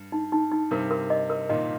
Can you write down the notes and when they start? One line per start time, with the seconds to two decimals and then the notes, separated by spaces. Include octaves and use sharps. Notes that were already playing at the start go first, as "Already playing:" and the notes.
Already playing: G2
0.12 D#4
0.32 D#4
0.52 D#4
0.71 G2 C3 A#4
0.91 A#4
1.10 D#5
1.30 A#4
1.49 A#2 D#3 D#5